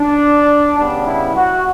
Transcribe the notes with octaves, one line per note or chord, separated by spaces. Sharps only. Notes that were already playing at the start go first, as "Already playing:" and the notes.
Already playing: D4
C#3 G3 B3 D4
E4
F#4